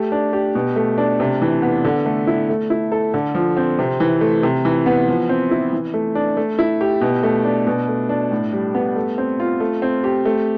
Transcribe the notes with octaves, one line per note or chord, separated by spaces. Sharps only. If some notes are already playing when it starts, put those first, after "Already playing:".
Already playing: A3 G4
D4
G4
B2
A3
D4
C3
E3
B3
D3
A3
E4
A3
E4
A4
D3
F3
C4
C3
E3
A3
C3
E3
B3
F3
C4
E4
E3
A3
D4
A3
E4
G4
B2
A3
D4
B2
A3
D4
A2
G3
B3
A3
C4
F4
A3
C4
G4
A3